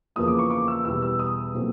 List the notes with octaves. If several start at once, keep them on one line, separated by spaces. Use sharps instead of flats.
E2 C#3 F3 A#3 D#6
D6
C#6
D6
E6
E2 B2 G3 E6
E6
D#6
A#2 F#3 A3 C4